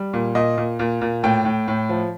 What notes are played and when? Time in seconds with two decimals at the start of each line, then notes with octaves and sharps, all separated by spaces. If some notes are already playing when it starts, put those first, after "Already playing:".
Already playing: G3
0.13 A#2
0.35 A#2 D#5
0.58 A#2
0.79 A#2
1.01 A#2
1.23 A2 G5
1.45 A2
1.68 A2
1.89 F3